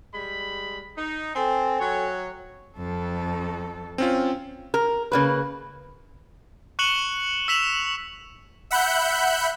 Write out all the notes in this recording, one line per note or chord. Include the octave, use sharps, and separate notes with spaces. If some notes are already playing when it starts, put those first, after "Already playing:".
G3 G#3 B5
D#4
C4 A4 G5 G#5
F#3 C#5
F2 A4
C4 C#4 F4
A#4
C#3 A#3 B4
C#6 F#6 C#7 E7 F#7 G7
E6 B6 E7 F7
E5 F#5 B5 F#6 G6